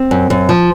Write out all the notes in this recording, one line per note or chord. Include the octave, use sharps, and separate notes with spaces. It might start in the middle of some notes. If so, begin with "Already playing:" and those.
Already playing: C4
F#2
F#2
F3